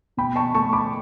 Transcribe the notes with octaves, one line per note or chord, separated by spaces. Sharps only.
B2 G5 B5
A5 C#6
A3 A5 C#6
B5 D6